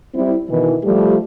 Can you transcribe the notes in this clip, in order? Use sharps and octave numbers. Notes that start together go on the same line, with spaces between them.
G3 C4 E4
B2 D#3 E3
F3 G3 A3 G4